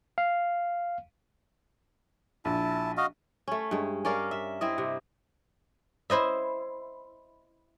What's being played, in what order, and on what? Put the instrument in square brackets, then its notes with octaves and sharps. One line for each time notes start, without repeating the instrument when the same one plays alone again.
[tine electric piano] F5
[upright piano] A#1 [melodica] E4 A5
[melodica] F#4 D#5 F5
[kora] A3 C#4
G2 G#3
C#4 A#4 D5 F5
E5
C4 E4 D#5
C3
[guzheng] E4 C5 D#5 E5